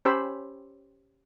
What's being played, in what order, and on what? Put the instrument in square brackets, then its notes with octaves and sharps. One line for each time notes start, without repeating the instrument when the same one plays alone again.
[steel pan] C#4 G4 C5 C#5 B5 E6